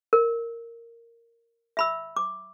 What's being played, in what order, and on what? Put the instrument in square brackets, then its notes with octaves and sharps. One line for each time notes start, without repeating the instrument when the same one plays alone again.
[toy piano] A#4
E5 B5 E6
D6